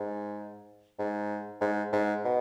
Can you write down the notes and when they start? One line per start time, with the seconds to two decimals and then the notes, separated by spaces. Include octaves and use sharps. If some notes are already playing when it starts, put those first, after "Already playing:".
Already playing: G#2
0.99 G#2
1.61 G#2
1.93 G#2
2.25 B2